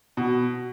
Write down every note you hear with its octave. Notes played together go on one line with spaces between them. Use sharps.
B2